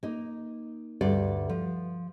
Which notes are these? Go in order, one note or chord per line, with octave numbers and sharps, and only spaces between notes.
A#3 D#4
D2 G2 A4 D5
F3